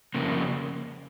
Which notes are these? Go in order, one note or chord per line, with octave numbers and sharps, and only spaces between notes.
F2 C#3 A#3